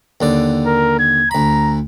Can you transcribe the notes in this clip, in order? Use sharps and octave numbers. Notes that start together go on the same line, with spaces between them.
D#2 D3 D5
A#4
G#6
D2 A#5 B5